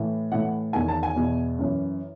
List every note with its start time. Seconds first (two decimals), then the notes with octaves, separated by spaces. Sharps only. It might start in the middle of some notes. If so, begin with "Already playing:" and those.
Already playing: A2 E3
0.32 A2 E3 F#5
0.73 E2 D#3 G#5
0.88 A5
1.03 G#5
1.16 E2 B2
1.59 F#2 E3